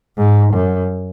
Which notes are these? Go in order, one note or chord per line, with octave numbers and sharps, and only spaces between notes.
G#2
F#2